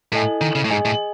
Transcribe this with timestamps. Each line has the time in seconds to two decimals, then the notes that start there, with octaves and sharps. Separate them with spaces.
0.12 A2 E4 A4 D#5 G#5
0.41 D#3
0.55 C#3
0.65 A2
0.70 G#2 G#4 D#5 G#5
0.85 A2